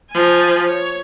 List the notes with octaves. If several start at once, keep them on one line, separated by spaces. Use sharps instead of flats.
F3 G#5
C#5